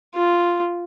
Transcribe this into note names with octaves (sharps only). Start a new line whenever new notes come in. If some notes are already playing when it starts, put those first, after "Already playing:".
F4